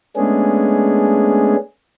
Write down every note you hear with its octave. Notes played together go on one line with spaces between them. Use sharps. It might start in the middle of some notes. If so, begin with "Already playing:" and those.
G#3 A3 B3 C#4 D4 G#4